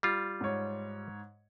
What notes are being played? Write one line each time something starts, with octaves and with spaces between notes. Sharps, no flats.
G3 F4
G#2 C#5